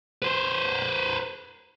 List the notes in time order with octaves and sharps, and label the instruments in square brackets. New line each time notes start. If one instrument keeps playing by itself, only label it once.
[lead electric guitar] B4 C5